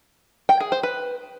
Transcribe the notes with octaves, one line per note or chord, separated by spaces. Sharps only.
G5
G#4
C5
B4